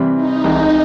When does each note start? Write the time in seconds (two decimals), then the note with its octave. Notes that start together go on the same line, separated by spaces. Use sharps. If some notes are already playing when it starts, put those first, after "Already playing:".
Already playing: C3 E3 G3 C4
0.15 D#4
0.44 C2 C3 E3 G#3